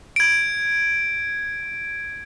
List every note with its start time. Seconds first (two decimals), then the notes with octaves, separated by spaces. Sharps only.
0.16 G#6 D7